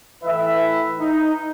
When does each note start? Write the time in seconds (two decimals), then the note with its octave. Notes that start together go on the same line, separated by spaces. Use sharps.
0.24 A2 E3 B4 E5
0.99 D#4